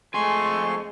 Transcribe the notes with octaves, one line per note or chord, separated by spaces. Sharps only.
F2 G#3 A3 G#5 C6 C#6